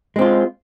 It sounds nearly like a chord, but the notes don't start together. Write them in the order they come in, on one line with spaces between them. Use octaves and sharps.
G#3 C4 F4